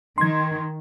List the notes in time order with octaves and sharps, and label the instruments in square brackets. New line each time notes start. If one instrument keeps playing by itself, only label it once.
[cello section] D#3 [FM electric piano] C6 G#6